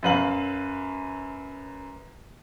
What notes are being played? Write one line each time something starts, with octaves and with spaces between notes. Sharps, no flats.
F#2 F#3 B4 F5 F#7